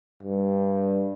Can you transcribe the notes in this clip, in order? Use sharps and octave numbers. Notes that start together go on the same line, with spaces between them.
G2